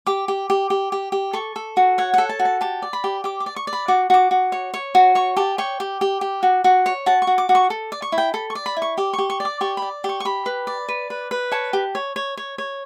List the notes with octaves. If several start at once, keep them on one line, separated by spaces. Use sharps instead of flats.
G4 D6
G4
G4
G4
G4
G4
A4 C#6
A4
F#4
C#5 F#5
A4 F#5
A5
F#4
A5
G4 A5
D5
B5
G4
G4 D6
D6
D5
C#6
D5
B5
F#4 D6
F#4 D6
F#4
C#5
C#5
F#4
C#5 C#6
G4 A5
C#5 G5
G4
G4
G4
F#4
F#4
C#5
F#4 A5
C#6
F#4
D6
F#4
C#6
A4
D5
C#6
E4
G5
A4 B5
C#6
D5
B5
E4
C#6
G4 D6
G4 C#6
C#6
D5
D6
G4 C#6
D5 B5
G4 C#6
C#6
G4 B5
B4
D5
B4
B4
B4
C#5 A5
G4
C#5
C#5
C#5
C#5